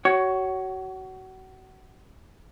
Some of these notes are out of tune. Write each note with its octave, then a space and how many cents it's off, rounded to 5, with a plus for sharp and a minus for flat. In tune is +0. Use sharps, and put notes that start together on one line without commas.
F#4 +30 C#5 +10